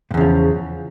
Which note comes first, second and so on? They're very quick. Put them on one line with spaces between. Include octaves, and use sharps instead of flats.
A2 E2 C#3 F3